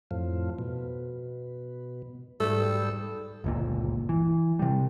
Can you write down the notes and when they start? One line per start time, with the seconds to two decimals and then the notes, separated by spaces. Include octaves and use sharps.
0.11 F2 A2 F3
0.59 B2
2.40 G#2 G3 A4
3.44 G1 C#2 A#2
4.09 E3
4.59 C3 G3